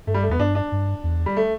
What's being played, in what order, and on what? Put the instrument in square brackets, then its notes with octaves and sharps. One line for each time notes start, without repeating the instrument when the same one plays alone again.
[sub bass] G2 [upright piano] A3
[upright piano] G3
A3
[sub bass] E2 [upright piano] B3
[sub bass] G2 [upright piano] D4
[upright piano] D4
[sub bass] G2
E2
[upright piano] G3
A3